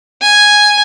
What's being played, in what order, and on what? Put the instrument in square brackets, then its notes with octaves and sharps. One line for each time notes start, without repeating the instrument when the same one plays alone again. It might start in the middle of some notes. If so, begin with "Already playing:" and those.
[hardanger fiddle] G#5